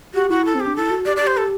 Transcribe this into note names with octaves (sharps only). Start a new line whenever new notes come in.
F#4 G4
E4 F#4
A4
C4
G4
D4
E4 A4
F#4
G4 D5
D5
G4
C5
A4